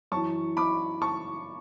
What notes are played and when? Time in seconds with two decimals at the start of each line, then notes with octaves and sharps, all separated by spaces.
0.12 F#2 E3 A5 C#6
0.57 B5 D6
1.02 A5 C#6